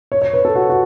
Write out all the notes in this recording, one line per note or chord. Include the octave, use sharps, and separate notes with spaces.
C#5
C#5
B4
A4
F#4
F#4